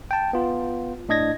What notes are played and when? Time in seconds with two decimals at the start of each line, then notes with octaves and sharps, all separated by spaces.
0.11 G5 A5
0.33 B3 F4
1.09 A2 D4 D#5 G#6 A#6